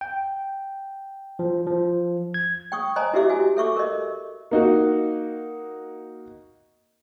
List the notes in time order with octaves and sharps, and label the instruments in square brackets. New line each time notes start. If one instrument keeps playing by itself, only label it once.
[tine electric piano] G5
F3
F3
G#6
[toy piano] G5 C#6 D#6
C5 D#5 G#5 A#5
E4 F#4 G4 D#5 E5 D6
F#4 G#5
A4 E5 C#6 D6
A#4 D#5
[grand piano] A#3 D#4 F#4